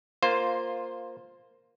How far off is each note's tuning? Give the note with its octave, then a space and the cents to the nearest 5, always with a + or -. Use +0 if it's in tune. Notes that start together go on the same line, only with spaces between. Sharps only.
A#3 +0 F4 +10 C5 +0